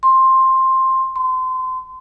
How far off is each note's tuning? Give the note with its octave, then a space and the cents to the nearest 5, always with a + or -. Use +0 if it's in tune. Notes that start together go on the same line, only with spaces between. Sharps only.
C6 +10
C6 -30